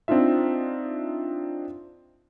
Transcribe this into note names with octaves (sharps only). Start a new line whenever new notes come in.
C4 D4 D#4 F4 E5